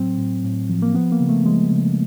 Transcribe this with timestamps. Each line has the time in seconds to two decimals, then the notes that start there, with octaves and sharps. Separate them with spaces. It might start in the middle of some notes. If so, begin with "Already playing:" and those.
Already playing: A2 F#3 C4
0.18 A2
0.44 A2
0.70 F3
0.82 A#3
0.94 F3 B3
1.12 A#3
1.20 C#3
1.29 A3
1.45 F3 G#3
1.71 C#3